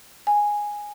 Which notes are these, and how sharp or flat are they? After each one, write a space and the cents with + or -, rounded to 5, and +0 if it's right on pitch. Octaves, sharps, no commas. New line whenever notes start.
G#5 -5